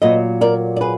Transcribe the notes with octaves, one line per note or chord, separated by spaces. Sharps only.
A#2 F#3 B4 D#5
A#4 D5
D5
G#4 B4